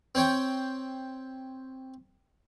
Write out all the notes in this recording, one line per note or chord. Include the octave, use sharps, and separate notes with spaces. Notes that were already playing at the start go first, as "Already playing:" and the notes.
C4 C5 C#5 G5